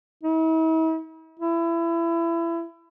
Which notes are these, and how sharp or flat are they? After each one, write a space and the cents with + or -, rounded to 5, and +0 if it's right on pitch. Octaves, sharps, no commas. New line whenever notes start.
E4 -45
E4 +25